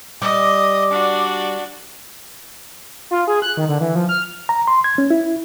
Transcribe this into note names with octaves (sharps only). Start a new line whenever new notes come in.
G3 D#5 D6
D4 F#4
F4
G#4
F#6
D#3
D3
E3
F3
F6
A#5
C6
G#6
C#4
E4